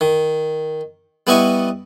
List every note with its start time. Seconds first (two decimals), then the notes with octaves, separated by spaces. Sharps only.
0.01 D#3
1.27 G3 B3 E4 D#5 C#6